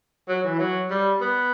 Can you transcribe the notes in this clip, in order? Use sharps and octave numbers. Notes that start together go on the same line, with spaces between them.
F#3
E3
F#3
G3
B3